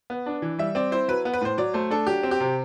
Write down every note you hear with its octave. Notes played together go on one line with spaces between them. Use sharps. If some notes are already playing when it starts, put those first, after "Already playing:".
B3
D4
E3
G3 E5
C4 D5
E4 C5
F#3 B4
B3
B4
A2 C5
F#3 D5
A3 C5
D4 A4
F#3 G4
C4
G4
C3